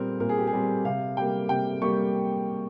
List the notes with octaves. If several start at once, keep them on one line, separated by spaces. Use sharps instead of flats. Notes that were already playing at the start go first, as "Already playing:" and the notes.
Already playing: A#2 G3 C4 A#4
A#2 A#4
G#4
G4
G#4
G3 C4
C3 F5
G3 A#3 G5
C3 G5
G3 A#3 C#6